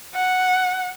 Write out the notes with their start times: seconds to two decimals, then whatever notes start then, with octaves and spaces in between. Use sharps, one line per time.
0.15 F#5